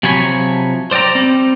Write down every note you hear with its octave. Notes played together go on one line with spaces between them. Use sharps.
C3 F3 F#3 C#5 G#5 B5
C5 D5 E5 G5 A#5
G3 C4